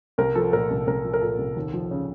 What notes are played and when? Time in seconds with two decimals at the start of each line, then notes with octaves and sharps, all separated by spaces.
0.18 C2 A#4
0.35 F3 A4
0.53 A#2 A#4
0.70 C2
0.87 C2 A#4
1.04 F3
1.13 A#4
1.21 A#2 A4
1.38 C2
1.56 D#2
1.74 F3
1.91 C#3